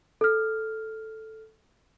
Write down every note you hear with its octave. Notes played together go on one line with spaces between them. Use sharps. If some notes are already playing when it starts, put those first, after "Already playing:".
A4 F6